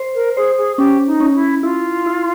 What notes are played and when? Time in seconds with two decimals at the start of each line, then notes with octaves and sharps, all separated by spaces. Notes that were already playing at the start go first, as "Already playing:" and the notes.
Already playing: C5
0.14 A#4
0.36 G#4 C5
0.58 G#4
0.78 C#4 G4
1.07 D#4
1.20 C#4
1.35 E4
1.63 E4 F4
2.06 E4